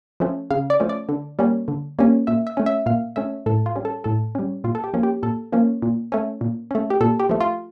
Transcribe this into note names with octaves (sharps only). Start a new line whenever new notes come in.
F3 A3 C#4
C#3 F5
D5
F3 A3 C#4
D5
D3
G3 A#3 C#4
D3
G3 A#3 C#4
A#2 E5
E5
A3 C#4
E5
A#2 F5
A3 C#4 E5
A2 A4
F4
G3 C#4
A4
A2 A4
G3 C#4
A#2 F4
A4
G4
F3 A#3 C#4
G4
A#2 A4
F3 A#3 C#4
A#2
A3 C#4
A#2
A3 C#4
G4
A#2 A4
G4
F3 A3
F4